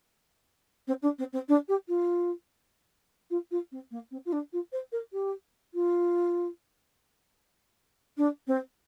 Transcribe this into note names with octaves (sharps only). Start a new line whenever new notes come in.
C4
D4
C4
C4
D4
G4
F4
F4
F4
C4
A#3
C4
F4
D4
F4
C5
A#4
G4
F4
D4
C4